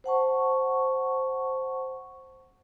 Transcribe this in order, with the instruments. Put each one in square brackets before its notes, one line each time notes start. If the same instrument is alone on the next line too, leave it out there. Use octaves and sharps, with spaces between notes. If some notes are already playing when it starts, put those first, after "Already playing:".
[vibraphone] C5 F#5 A5 C#6